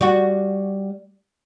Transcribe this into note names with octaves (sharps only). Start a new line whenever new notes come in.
G3 F#4